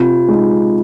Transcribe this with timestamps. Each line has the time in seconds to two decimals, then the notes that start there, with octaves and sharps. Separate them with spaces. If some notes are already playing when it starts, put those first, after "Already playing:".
Already playing: C3 F4
0.28 G#3 D#4